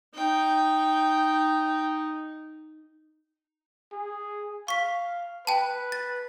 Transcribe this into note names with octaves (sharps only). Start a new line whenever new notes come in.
D#4 G5
G#4
F5 C#6 B6
B4 G5 A5
A6